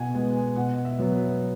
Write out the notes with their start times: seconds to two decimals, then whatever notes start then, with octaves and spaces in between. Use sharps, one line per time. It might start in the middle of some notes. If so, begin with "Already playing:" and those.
Already playing: B2 F#5 G#5
0.15 G#3 B3 G#5
0.36 G#5
0.56 B2 F#5
0.85 E5
0.99 F#3 B3
1.12 B4